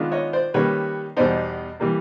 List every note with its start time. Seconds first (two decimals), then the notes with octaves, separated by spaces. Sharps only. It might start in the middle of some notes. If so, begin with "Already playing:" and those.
Already playing: D#3 G#3 B3 D4 F4
0.12 C#5 D#5
0.33 C5 D5
0.54 D#3 G3 A#3 C#4 B4 C#5
1.17 E2 B2 G3 B3 D#4 C5 D5
1.80 E3 G3 A#3